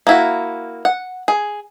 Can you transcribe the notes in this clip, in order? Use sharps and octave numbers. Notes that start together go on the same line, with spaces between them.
A#3 E4 F#4
F#5
G#4